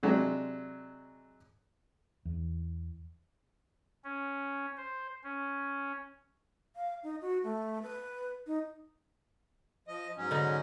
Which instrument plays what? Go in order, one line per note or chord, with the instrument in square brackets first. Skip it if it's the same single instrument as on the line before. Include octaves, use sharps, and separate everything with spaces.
[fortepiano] C3 F#3 G#3 D4 G4
[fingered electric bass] E2
[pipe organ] C#4
C5
C#4
[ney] F5
D#4
F#4
A3
B4
D#4
[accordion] F3 D#5
G#2 F#3 C#4
[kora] D3 D#4